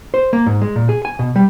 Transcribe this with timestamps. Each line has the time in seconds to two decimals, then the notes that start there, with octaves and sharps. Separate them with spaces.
0.14 C5
0.33 A#3
0.46 G#2
0.61 G#3
0.76 A#2
0.89 G#4
1.05 G#5
1.19 B2
1.36 G3